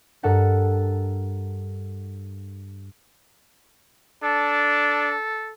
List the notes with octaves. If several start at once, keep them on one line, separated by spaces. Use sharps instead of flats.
G2 A4 A#4 F#5 A6
D4 A4